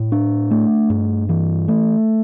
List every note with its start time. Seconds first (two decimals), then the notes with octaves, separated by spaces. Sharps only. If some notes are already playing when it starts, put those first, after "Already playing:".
Already playing: A2
0.12 D4
0.51 A3
0.90 G2
1.29 E3
1.68 A3